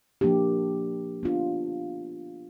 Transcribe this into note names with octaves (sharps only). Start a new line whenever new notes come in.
F3 A#3 D4 G4
B3 D4 F4